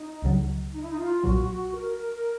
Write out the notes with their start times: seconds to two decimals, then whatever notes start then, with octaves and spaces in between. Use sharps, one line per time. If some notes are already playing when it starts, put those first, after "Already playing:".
Already playing: D#4
0.22 C#2 C#3 F#3
0.73 D#4
0.81 E4
0.89 D#4
0.98 F4
1.23 B1 A#2 F#3 F#4
1.48 F#4
1.74 A#4